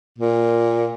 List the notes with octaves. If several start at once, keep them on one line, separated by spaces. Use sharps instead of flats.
A#2